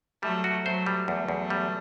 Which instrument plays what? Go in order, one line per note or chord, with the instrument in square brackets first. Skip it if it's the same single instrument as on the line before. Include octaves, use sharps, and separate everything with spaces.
[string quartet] F#3 A3 [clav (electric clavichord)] G3
[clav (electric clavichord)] F#4
[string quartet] F#3 A3 [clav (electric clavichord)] C5
[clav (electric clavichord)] G3
[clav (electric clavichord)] E2 [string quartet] F#3 A3
[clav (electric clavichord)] E2
G3